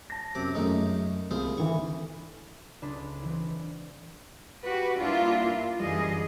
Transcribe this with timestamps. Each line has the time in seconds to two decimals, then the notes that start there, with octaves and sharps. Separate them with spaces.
0.10 A5 A#6
0.35 F#2 C3 D6
0.55 F#2 G#3 A3 C#4 D#4
1.31 C2 F4 G#4 C5
1.58 D3 E3 C#6
2.82 C#2 D4 G#4 A4 B5
3.22 E3 C4 E4
4.61 F#4 G4 B4
4.97 G2 A#3 D4 E4 F4
5.80 F#2 D3 E3 G3 G#4 D#5